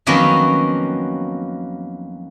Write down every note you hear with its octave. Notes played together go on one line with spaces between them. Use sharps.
F2 D#3 F#3 A#3 B3 C#4